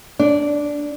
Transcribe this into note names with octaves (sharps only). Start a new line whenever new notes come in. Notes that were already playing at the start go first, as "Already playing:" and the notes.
D4